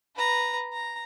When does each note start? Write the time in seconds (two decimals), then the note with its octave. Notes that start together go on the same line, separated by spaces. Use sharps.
0.15 B4 A#5
0.73 A#5